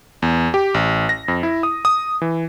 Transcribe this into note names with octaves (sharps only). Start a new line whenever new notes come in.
E2
G4
A1
A#6
F2
E4
D#6
D#6
E3